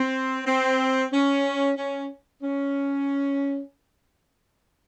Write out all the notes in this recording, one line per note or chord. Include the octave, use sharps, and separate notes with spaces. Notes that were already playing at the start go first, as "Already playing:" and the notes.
Already playing: C4
C4
C#4
C#4
C#4